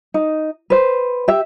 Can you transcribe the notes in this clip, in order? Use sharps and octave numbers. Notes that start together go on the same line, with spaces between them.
D#4
B4 C5
G4 E5